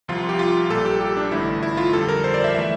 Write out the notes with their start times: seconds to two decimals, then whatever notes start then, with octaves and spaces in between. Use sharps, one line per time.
0.08 C2 C3 F3 F4
0.29 G4
0.39 F4
0.70 A#1 A#2 G3 A4
0.85 G4
1.01 G4
1.17 D4
1.31 A1 G2 D3 A3 E4
1.63 E4
1.77 F4
1.93 F2 D3 G3 A4
2.09 A#4
2.24 C5
2.34 D5
2.44 E5
2.55 E3 A3 E5